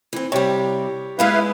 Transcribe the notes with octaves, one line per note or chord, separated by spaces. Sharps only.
E3 C4
C3 G3 G4 C#5
G#3 B3 D#4 E4 B4 F5